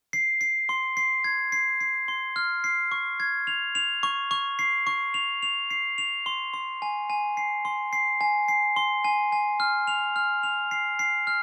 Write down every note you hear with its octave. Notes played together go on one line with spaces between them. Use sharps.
C7
C7
C6
C7
G#6
C7
C7
C6
F6
C7
C#6
G#6
F7
F7
C#6
C#6
C7
C#6
F7
F7
C7
F7
C6
C6
G#5
G#5
C7
C6
C7
G#5
C7
C6
G#5
G#5
F6
F7
F6
F7
C7
C7
F6